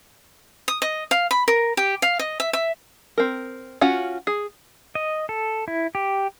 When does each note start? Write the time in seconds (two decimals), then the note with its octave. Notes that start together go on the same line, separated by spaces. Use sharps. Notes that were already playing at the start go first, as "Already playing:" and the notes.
0.68 D#6
0.82 D#5
1.11 F5
1.31 B5
1.48 A#4
1.77 G4
2.02 F5
2.19 D#5
2.40 E5
2.53 E5
3.18 C4 A#4
3.81 C#4 F4 F#4 F#5
4.27 G#4
4.95 D#5
5.29 A4
5.68 E4
5.95 G4